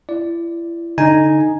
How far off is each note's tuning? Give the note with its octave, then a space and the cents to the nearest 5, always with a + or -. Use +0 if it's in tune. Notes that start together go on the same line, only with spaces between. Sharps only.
E4 +35 D5 +0
D3 -25 D#4 +0 G#5 +0